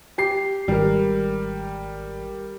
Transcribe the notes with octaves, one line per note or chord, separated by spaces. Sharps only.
G4 C7
G#1 G3 A#4